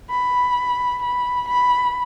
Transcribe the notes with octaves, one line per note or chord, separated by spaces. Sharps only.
B5
B5
B5